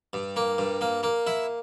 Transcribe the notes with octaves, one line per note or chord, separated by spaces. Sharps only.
G2
A#3
G2
A#3
A#3
E4